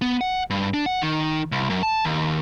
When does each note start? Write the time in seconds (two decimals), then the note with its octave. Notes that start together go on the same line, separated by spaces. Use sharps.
0.02 B3
0.21 F#5
0.50 G2
0.74 D4
0.86 F#5
1.02 D#3
1.52 C2
1.70 F#2
1.83 A5
2.05 D#2